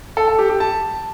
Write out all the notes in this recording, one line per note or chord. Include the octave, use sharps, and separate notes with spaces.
A4
A4
G4
G4
A5